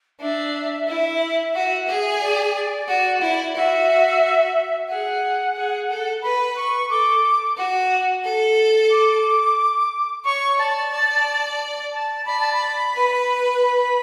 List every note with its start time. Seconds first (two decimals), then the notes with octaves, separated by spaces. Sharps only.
0.20 D4 E5
0.88 E4
1.54 F#4
1.88 G#4
2.21 D5
2.88 F#4
3.21 E4
3.56 F#4 E5
4.89 G#4 F#5
5.57 G#4
5.90 A4
6.23 B4 B5
6.56 C#6
6.90 A4 D6
7.57 F#4
8.24 A4
8.91 D6
10.25 C#5 C#6
10.58 D5 A5
10.91 D5
11.93 A5
12.26 D5 B5
12.40 A5
12.53 B5
12.93 B4
13.60 B5